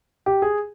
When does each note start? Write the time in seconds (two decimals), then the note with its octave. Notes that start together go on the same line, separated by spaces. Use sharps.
0.26 G4
0.42 G#4